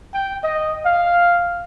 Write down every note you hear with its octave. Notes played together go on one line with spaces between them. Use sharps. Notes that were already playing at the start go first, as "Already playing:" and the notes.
G5
D#5
F5